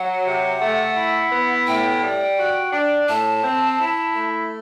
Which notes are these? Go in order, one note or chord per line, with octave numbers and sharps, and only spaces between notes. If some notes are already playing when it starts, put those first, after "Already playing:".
Already playing: F#3 F#5
C3
A3
E4
B3
A2 G5
G3
F#4
D4
A2 A5
C4
E4
A3